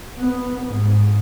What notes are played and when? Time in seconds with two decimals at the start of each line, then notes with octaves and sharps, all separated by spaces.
0.19 B3
0.65 G#2